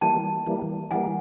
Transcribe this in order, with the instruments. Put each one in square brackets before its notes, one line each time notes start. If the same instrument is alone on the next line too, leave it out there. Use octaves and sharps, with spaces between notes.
[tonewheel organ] E3 G3 A#3 [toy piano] G5 A5
[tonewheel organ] E3 G3 A#3
[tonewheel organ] E3 G3 A#3 [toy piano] F#5 G#5